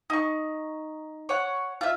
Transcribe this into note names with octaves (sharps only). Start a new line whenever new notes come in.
D#4 C#6
C#5 F#5
F4 E5